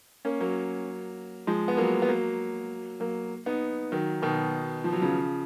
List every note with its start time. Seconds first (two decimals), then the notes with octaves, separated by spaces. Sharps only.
0.25 A#3 C#4
0.40 F#3 A#3
1.47 F3 G#3
1.68 B3
1.77 F#3 A#3
2.02 B3
2.08 F#3 A#3
3.00 F#3 A#3
3.46 B3 D#4
3.92 D#3 F#3
4.22 B2 D#3
4.84 F3
4.93 F#3
5.02 C#3 F3